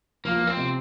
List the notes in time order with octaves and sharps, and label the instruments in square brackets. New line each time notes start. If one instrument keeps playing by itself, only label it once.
[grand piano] F3 [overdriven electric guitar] A#3
[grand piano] F3
[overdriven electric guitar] C4
[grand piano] C3